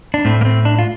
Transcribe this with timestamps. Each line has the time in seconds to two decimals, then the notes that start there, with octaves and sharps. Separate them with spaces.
0.14 D4
0.25 A2 A3 C4
0.41 A#3
0.45 C4
0.65 D4
0.79 F4